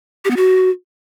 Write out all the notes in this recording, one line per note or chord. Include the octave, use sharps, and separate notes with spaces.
G4
B3
F#4